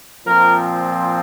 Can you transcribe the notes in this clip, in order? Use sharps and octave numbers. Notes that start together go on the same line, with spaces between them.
A#2 F3 C4 A#4